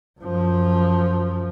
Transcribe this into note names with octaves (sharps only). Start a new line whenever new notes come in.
F#2 F3